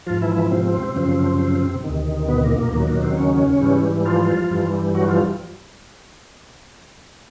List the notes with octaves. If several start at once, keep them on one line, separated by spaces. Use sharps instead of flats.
G#2 F3 F4
E3 E4
E3 E4
C3 C4
F#2 C#3 F3
D2 C3 D#3
B2 B3
A#2 A#3
A#2 A#3
D#2 A#2 D#3 F#3 A#3
A#2 A#3
C3 C4
C#3 C#4
G#2 E3 G3
F3 F4
G2 E3 G3
F#3 F#4
F3 F4